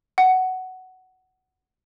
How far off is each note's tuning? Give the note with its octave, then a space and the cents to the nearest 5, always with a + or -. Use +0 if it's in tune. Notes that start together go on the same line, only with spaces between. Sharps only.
F#5 +10